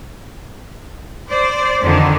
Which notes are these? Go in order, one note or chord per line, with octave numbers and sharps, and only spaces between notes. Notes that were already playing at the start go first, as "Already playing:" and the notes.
C5 D5
F2 D3 D#3